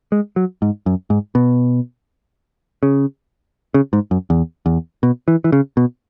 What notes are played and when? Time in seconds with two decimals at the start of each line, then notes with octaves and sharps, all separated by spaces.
0.12 G#3
0.36 F#3
0.62 G#2
0.86 F#2
1.10 G#2
1.35 B2
2.83 C#3
3.74 C#3
3.93 G#2
4.11 F#2
4.30 E2
4.66 E2
5.03 B2
5.28 E3
5.44 E3
5.52 C#3
5.77 B2